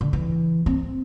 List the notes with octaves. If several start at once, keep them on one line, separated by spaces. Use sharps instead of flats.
D3
E3
C4